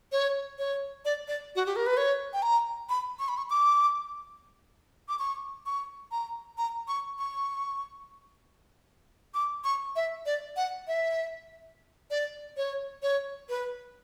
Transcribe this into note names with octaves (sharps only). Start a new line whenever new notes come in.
C#5
C#5
D5
D5
F#4
G4
A#4
B4
C#5
G5
A#5
B5
C#6
B5
C#6
D6
D6
C#6
C#6
A#5
A#5
C#6
C#6
D6
C#6
E5
D5
F#5
E5
D5
C#5
C#5
B4